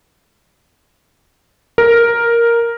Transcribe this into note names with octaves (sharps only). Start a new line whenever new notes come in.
A#4